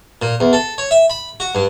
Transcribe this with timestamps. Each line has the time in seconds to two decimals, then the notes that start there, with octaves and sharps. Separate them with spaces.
0.22 A#2
0.40 E2
0.53 A4
0.78 C#5
0.91 E5
1.10 B5
1.40 F#4
1.55 G2